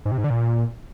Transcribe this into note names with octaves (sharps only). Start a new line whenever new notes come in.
G#2
C3
G#2
D3
A#2